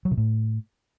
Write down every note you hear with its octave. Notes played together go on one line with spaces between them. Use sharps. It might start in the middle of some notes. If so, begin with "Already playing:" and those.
F#3
C3
A2